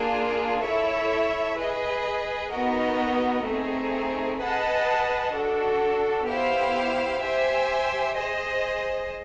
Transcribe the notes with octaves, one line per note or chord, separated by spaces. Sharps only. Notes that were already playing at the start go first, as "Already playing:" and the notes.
Already playing: A#3 D4 F4 G#4
E4 A4 C#5 E5
G#4 B4 D#5
B3 D#4 F#4 A#4 D#5
A3 C4 D#4 G#4
G#4 B4 D#5 F#5 A5
D4 F#4 A4
B3 E4 G4 C5 F5
G4 C5 E5 G#5
G#4 C5 D#5